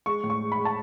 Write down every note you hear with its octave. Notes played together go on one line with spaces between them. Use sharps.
G#3 C#6
A2
C#6
G#3
B5
G#3
A5